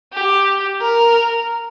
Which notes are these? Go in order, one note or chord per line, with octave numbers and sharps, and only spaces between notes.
G4
A#4